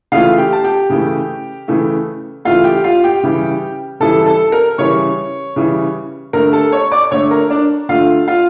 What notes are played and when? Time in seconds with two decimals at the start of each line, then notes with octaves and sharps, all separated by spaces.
0.12 C#3 E3 A3 F4 F5
0.38 G4 G5
0.53 A5
0.64 G4 G5
0.90 C#3 E3 A3
1.68 C#3 E3 A3
2.45 C#3 E3 A3 F4 F5
2.64 G4 G5
2.84 F4 F5
3.04 G4 G5
3.23 C#3 E3 G3
4.00 C#3 E3 G3 A4 A5
4.26 A4 A5
4.52 A#4 A#5
4.78 C#3 E3 G3 C#5 C#6
5.56 C#3 E3 G3
6.33 D3 A3 A#4 A#5
6.53 A4 A5
6.72 C#5 C#6
6.92 D5 D6
7.11 D3 A3 C#5 C#6
7.31 A#4 A#5
7.50 D4 D5
7.89 D3 A3 F4 F5
8.28 F4 F5